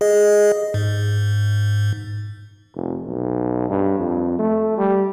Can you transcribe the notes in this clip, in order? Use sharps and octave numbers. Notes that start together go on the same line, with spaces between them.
G#4 D#5
G#2
F1
B1
G2
F2
A3
G3